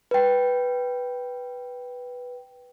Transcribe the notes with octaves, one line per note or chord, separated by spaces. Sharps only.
B4 G5